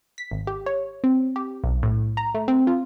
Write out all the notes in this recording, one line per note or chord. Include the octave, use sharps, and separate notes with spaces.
B6
G#1
G4
C#5
C4
G4
B1
A2
A#5
A3
C4
F4